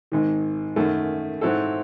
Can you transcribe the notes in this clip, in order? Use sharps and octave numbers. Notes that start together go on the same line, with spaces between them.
G#1 G#2 D#3
F#2 D#3 A3
G#2 F#3 C4 E4 A4